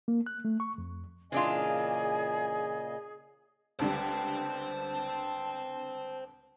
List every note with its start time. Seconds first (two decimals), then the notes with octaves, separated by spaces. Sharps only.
0.08 A#3
0.26 F#6
0.45 A3
0.60 C#6
0.78 F2
1.32 A#2 C#3 E3 D4 F4 G#4 D#5 G#5
3.79 C#2 D3 G3 C5 G5 A5